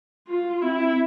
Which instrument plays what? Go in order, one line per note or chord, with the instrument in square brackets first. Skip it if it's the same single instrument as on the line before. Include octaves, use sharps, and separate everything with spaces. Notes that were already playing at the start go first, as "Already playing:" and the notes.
[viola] F4
[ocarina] C4 [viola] E4